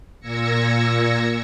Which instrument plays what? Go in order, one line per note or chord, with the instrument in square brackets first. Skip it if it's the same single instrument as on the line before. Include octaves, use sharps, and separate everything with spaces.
[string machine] A#2 E6 G#6 A#6 C#7